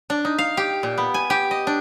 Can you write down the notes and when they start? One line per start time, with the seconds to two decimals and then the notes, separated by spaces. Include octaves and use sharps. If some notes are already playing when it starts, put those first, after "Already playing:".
0.10 D4
0.25 D#4
0.38 F5
0.57 G4
0.83 A#2
0.98 B3
1.14 G#5
1.30 G4
1.51 D#5
1.67 D4